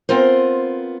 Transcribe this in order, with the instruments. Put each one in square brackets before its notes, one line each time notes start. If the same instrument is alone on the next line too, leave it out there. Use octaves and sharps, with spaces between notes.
[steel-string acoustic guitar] B3 C4 F4 A#4 C5